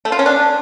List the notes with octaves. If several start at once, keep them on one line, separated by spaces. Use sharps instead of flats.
A3
F4
C#4
D4